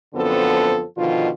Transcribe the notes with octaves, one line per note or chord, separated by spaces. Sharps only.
F#2 D3 F3 B3 C4 A4
B2 D3 D#3 F3 F4